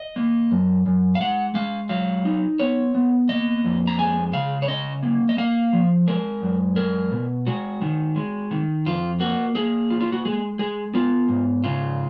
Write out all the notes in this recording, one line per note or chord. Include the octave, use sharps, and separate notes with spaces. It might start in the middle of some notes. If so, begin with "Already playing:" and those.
Already playing: D#5
A#3
F#2
F#2
F5
G#3 F#5
G#3 F5
F#3 F5
D#4
B3 C#5
B3
A#3 D#5
F2
A#5
G#3 G#5
C#3 F5
C#5
C#4 D#5
A#3
D#5
A#3 F5
F3
G#3 A#4
F#2
G#3 A#4
B2
G#3 F#4
D#3
G#3
D#3
F2 F4
A#3 F#4
A#3 G#4
F4
F4
F#4
G#3 G#4
G#3 G#4
B3 F4
G#2
C#3 F4